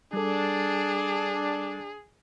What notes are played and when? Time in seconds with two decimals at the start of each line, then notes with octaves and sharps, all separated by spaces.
0.13 G3 D4 G#4 A4